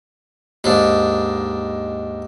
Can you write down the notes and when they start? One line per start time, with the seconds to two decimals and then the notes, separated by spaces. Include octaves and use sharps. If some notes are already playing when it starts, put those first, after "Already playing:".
0.64 D#2 G#2 D4